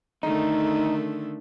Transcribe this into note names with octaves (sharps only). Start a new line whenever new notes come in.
D3 D#3 A3 D#4